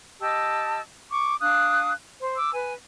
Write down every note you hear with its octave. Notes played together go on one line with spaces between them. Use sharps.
G4 D#5 A5 E6
C#6 D6
D4 F5 D#6 F#6
C5
D6 E6
B4 G#5